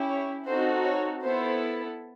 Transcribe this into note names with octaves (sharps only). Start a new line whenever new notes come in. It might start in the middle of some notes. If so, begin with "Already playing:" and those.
Already playing: C#4 E4 G4
C#5
C4 D#4 F#4 A4 C5
C#5
B3 E4 A4 C5